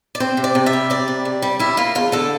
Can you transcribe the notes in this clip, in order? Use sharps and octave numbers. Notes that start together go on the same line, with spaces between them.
D5
C4 C5
C3
D5
C3
E5
G3
C4 D5
C3
C3
G3
G3 E4
A#3 F4
E2 F4
D3 A4